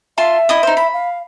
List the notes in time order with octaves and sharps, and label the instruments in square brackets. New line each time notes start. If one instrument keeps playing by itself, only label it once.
[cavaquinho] F4 A5 C6 [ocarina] E5
[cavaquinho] E4 D#5 D#6
D#4 C5
B5
[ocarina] F5